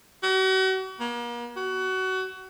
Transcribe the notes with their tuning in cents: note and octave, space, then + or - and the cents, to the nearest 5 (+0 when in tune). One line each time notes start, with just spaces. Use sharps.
F#4 +40
A#3 +40
F#4 +25